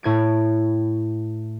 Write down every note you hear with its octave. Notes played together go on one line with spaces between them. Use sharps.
A2 G#6 D7